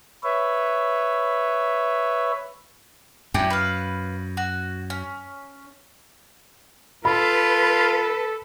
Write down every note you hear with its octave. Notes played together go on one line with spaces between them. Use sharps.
B4 C#5 E5
F#2 D4 E4 G4
B4 F5
F#4
C#4
F4 A4 B4 B5